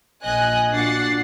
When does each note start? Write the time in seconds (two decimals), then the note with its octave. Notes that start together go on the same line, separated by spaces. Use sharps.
0.24 A#1 D#5 G#5 F#6
0.73 A#2 D4 F#4 F#5 A6 C7